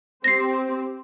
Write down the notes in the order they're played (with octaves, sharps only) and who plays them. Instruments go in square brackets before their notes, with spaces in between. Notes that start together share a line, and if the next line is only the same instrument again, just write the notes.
[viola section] C4 G4 C5 [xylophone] A#6 C7